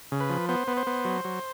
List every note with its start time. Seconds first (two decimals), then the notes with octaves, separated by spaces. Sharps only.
0.12 C#3
0.20 B4
0.29 F3
0.49 B3 C5
0.67 B3
0.77 C5
0.87 B3
1.05 F#3
1.25 F#3